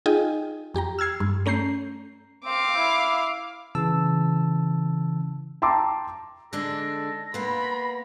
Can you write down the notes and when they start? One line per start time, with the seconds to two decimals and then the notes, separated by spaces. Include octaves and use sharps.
0.06 D#4 F4 G#4 D#5 G5 G#5
0.74 F2 G4 G5 A#5
0.99 E6 F6 G#6 C7
1.20 G2
1.46 A3 C#4 A#5 G6 C7
2.45 C4 F5 D6
2.76 E4
3.75 C#3 E3 A5 E6
5.62 G5 A5 A#5 C6 D6
6.53 D3 G#3 D4 A4 A#6
7.34 A#3 B3 B5 C6